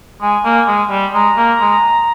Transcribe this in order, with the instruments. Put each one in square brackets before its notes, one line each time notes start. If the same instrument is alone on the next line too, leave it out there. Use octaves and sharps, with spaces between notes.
[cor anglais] G#3 [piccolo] G#5
[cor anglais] A#3
G#3
G3
[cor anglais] G#3 [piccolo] A#5
[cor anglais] A#3
G#3